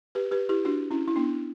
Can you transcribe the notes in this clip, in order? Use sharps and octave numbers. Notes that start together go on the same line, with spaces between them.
G4 B4
G4 B4
E4 G4
D4 F#4
C#4 E4
E4
B3 D4